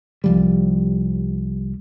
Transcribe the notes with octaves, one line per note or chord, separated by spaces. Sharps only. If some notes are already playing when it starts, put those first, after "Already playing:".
C2 F3 G3